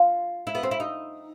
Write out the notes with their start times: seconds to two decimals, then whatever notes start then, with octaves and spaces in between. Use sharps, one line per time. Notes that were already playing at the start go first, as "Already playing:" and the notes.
Already playing: F4
0.47 E4
0.55 B3
0.63 C4
0.71 E4
0.80 D#4